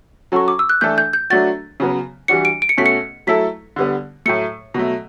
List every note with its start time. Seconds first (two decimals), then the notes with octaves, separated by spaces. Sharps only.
0.32 F#3 C#4 F#4 A4 C#6
0.48 D6
0.59 E6
0.69 F#6
0.81 E3 A3 D4 A4 G6
0.98 G6
1.13 G6
1.30 F#3 A3 D4 F#4 A6
1.80 C#3 F#3 B3
2.28 E3 G3 D4 F#4 C#7
2.45 D7
2.62 D7
2.69 C#7
2.78 B2 A3 C#4 F#4 A4 B6
2.86 C#7
3.27 F#3 A3 E4 A4 B6
3.76 D3 G3 B3
4.26 A2 F#3 A3 C#7
4.74 B2 F#3 A3